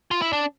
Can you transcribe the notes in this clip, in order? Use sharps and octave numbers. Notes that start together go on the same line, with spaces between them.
F4
E4
D4